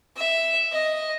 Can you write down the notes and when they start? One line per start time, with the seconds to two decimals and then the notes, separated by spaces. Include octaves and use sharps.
0.17 E5
0.72 D#5